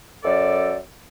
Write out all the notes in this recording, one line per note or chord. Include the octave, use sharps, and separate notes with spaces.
F#2 A4 D5